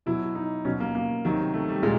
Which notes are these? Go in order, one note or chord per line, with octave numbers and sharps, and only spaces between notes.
B2 F#3 E4
D#4
B2 F#3 C#4
A#3
A#3
C3 D#3 F#3
A3
G3
A#2 G#3